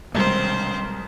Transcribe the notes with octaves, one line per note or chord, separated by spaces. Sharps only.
B1 C3 D#3 G3 G#3 C4 C5